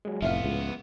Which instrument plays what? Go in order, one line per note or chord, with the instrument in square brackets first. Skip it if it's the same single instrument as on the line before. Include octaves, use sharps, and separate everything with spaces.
[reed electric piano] F#3 G#3
[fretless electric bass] F1 [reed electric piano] A2 [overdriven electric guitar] F3 B3 [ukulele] E5 F5
[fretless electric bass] C#2